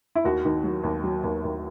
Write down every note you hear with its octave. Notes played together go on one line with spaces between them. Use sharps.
E4
D#2 F#4
D#3
F#3
D#2
F#3
D#2
D#2